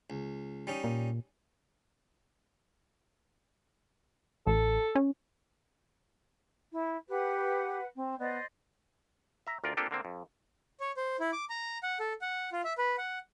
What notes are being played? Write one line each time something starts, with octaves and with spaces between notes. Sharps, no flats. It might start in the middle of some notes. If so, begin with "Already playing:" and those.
C#2
G3 C#4 D#4
A#2
A1 A4
C#4
E4
G4 B4 F#5
C4
B3 C5 D5 D#5
E5 A#5
D2 F4 A#4 D5
A#3 C4 D4 F4 G4 A4
D3 A#3 C4
F2
C#5
C5
E4
D6
A#5
F#5
A4
F#5
F4
E5
B4
F#5